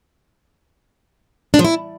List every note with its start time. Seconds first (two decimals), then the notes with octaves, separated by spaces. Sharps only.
1.54 D4
1.59 F3
1.64 E4